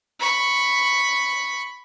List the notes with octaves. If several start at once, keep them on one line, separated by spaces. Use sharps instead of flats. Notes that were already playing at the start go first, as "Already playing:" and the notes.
B5 C#6